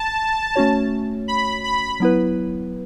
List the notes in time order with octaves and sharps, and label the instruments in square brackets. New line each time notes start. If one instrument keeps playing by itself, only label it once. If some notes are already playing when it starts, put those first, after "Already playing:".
Already playing: [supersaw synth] A5
[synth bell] A3 C#4 F#4 C#5
[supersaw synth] B5
B5
[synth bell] F#3 B3 E4 B4